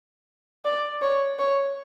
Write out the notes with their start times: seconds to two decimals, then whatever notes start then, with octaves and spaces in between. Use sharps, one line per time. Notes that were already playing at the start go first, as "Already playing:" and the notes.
0.65 D5
1.02 C#5
1.39 C#5